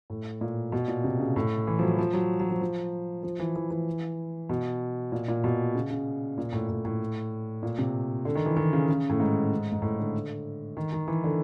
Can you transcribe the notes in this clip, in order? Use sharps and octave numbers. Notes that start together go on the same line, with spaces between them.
A2
A#2
B2
A#2
C3
C#3
A2
E3
F3
F#3
F3
F#3
F#3
F3
F3
F3
E3
E3
E3
B2
A#2
A#2
B2
C#3
C#3
A#2
A2
A2
A2
A#2
C3
D3
D#3
E3
D#3
C#3
C#3
A2
G#2
G#2
A2
D3
D#3
D#3
E3
D3